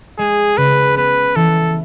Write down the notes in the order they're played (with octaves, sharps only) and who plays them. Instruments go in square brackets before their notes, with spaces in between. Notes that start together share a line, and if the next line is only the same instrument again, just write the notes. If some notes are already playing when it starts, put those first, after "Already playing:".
[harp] G#3 [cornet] G#4
[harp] C#3 [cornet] B4
[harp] B3 [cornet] B4
[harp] E3 [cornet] A4